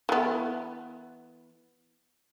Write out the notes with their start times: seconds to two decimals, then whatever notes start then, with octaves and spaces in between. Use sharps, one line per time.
0.09 E3 B3